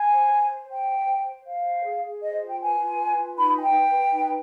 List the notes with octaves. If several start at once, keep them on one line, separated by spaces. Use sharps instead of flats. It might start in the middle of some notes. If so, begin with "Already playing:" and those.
Already playing: G#5
C5
C5
C5
C5 G5
C5
C5
C5
C5 F5
C5
G#4
G#4
C5 D#5
F4
G5
B4 G#5
F4
B4
F4
D#4 B5
B4 G#5
G5
B4
B4
D#4